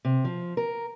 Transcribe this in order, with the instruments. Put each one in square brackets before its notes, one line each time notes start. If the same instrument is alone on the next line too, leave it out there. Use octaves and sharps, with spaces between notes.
[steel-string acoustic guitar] C3
F3
A#4